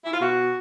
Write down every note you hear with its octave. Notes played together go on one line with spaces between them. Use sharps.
E4
F4
B2 F#4